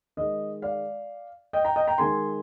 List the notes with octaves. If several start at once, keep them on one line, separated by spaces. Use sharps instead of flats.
D#3 G#3 D#5
D5 F5
D#5 G5
G5 A#5
D#5 G5
G5 A#5
D#3 G#3 G#5 C6